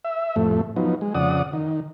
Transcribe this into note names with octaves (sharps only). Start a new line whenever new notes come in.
E5
F2 A2 A3
F3 F#3 B3 D#4
G#3
F2 C#3 D5 F#5 D#6
D#3